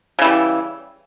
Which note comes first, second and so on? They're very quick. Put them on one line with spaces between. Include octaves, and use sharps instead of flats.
C#3 E3 G3